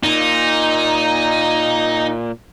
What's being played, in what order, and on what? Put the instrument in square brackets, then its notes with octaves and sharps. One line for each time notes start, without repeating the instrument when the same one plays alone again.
[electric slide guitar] A#2 [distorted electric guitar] D#4